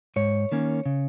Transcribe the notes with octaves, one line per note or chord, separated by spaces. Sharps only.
G#2 C#5
D#3 A#3 C#4
C#3